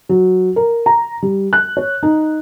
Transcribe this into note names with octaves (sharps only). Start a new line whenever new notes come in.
F#3
A#4
A#5
G3
F#6
C#5
D#4